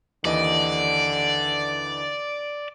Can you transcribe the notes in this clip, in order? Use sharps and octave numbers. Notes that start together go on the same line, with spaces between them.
D#2 D3 E3 D5 D#5